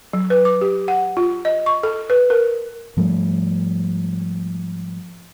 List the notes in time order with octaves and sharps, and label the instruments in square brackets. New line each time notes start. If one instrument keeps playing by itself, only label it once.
[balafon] F#3
B4
D6
G4
F#5
F4
D#5
C#6
A4
B4
A#4
[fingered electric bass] G#2 F3 G3 A3